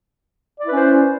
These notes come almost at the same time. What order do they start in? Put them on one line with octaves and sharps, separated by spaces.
D5 E4 B4 C#4 C5